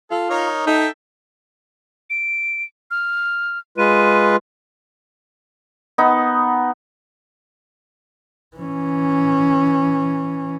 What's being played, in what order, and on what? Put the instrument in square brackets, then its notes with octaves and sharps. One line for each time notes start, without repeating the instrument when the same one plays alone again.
[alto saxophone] F4 [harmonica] A4
[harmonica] D#4 A#4 C#5
[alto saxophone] D#4 [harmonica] A4 E5 G5
[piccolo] D7
F6
[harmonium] G#3 F4 B4 [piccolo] D#7
[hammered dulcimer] B3 D#4
[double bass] E3 C#4